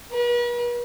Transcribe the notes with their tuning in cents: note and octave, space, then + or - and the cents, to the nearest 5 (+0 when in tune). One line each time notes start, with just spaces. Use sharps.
B4 -45